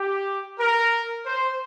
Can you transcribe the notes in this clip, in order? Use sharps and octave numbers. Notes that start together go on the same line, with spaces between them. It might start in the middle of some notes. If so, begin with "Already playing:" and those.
Already playing: G4
A#4
C5